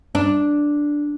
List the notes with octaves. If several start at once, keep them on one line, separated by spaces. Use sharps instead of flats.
D4